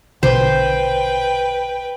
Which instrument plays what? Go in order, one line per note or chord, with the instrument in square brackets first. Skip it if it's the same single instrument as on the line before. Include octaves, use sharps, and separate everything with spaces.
[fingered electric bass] A#1 B2 D3 [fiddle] B4 G5 [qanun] C5